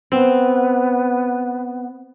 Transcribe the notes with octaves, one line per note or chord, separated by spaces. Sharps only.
B3 C4